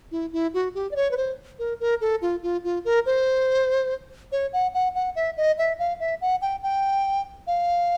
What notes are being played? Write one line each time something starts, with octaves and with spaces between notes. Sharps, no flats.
E4
E4
F#4
G4
D5
C#5
B4
C5
A#4
A#4
A4
F4
F4
F4
A#4
C5
C#5
F#5
F#5
F#5
E5
D#5
E5
F5
E5
F#5
G5
G5
F5